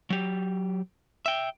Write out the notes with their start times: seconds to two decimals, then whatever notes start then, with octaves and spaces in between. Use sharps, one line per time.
0.10 F#3 G4
1.26 E5 G5